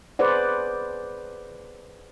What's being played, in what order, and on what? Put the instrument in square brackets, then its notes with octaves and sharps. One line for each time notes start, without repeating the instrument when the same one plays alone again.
[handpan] G#4 B4 C5 D5 F#5